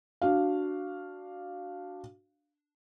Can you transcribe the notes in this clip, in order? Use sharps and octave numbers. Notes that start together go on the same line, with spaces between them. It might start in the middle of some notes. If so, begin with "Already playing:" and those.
D4 F#4 F5